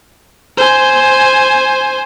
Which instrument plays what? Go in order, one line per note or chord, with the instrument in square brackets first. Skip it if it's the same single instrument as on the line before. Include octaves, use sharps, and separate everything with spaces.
[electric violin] C5 G#5